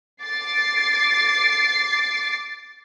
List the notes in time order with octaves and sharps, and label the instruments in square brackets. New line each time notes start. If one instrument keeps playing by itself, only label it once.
[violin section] D6 A6 C7